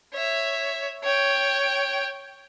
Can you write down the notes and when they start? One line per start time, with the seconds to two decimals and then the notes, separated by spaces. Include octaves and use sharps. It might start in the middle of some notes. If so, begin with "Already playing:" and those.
0.13 C#5 E5
1.04 C#5 G5